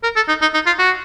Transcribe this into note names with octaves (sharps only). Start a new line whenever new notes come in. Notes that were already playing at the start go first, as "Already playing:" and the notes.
A#4
A4
D#4
D#4
D#4
F4
F#4